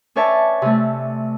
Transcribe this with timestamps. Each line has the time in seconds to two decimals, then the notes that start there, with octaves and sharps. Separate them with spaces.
0.16 C#4 B4 C#5 D5 E5 A5
0.62 C3 A3